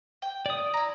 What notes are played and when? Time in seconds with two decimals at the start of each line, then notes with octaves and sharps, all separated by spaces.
0.22 G5
0.46 D5 D#6
0.74 E4 A#5